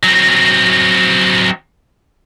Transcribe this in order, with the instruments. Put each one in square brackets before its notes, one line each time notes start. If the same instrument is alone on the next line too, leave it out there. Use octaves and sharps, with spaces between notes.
[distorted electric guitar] F#3 C4